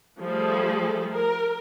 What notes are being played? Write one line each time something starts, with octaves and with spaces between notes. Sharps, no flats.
F3 G3 A3 G#4 A4
A#4